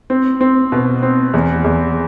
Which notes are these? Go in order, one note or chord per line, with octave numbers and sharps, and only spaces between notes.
C4
C4
B2
C4
E2
E2